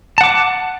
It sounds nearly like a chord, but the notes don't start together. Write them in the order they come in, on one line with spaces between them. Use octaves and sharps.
A5 F#5 D6